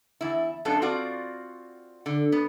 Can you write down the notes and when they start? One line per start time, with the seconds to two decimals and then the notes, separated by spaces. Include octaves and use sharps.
0.21 E2 E4
0.65 F#2 B3 D4 F4 A4
0.82 C4 F4 F#4 D5
2.06 D3
2.32 B3